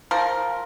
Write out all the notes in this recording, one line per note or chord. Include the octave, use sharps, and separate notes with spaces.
F3 A#4